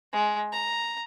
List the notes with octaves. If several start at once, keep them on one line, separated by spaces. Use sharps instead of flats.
G#3
A#5